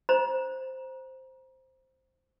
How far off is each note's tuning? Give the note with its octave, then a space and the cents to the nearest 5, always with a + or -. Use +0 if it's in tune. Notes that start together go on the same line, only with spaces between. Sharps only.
C5 +0 A#5 +30